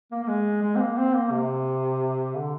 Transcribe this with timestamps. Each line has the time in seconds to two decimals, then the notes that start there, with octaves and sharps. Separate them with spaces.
0.11 A#3
0.23 A#3
0.28 G#3
0.62 G#3
0.76 C4
0.80 A#3
0.97 C4
1.14 A#3
1.31 C3
2.35 D3